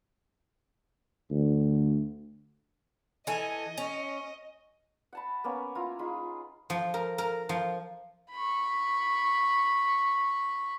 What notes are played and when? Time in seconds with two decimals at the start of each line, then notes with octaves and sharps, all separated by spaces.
1.31 D2
3.27 E3 A4 D#5 G#5
3.78 C#4
5.13 F#5 A5 B5
5.44 A#3 B3 C#4
5.75 E4 F4 A#5
5.99 D#4 F4 G#4 B5
6.70 F3
6.94 A#4
7.18 A#4
7.49 F3
8.32 B5 C#6